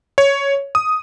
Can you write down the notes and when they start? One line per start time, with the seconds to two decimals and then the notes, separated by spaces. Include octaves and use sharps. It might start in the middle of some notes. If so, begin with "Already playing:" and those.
0.18 C#5
0.75 D#6